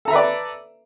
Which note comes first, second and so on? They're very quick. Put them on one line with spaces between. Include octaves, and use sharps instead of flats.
A4 A#5 E5 B4 D5